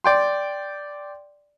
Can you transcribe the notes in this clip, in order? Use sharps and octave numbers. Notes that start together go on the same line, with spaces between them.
D5 G5 C6